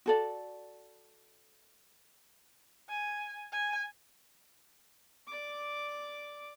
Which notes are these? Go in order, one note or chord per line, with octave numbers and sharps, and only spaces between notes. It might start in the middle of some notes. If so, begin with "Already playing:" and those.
F#4 A4 D5
G#5
G#5
D5 D6